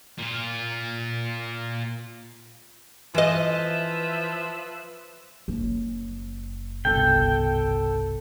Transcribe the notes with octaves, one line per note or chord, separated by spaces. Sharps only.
A#2 F4
E3 F3 B4 D#5 E5
F#1
G1 C2 B2 A4 G5